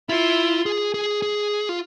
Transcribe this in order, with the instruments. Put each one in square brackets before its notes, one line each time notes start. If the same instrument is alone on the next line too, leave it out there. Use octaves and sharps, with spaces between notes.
[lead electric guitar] E4 [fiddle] F4
[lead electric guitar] G#4
G#4
G#4
F4